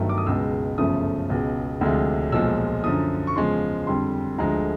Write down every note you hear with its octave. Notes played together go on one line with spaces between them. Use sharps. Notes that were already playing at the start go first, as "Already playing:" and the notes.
Already playing: G1 G2 D#3 F#3 A3
D6
D#6
C#2 B2 G#3 E6
G1 F#2 C#3 F3 A3 D#6
C#2 B2 G#3
D2 C3 F3 G#3
B1 A#2 F3 G#3 E6
F#2 D3 F3 D#6
C#6
E2 C#3 F3 G#3 C6
F2 D3 G3 C6
D2 D3 F3 G#3 A#5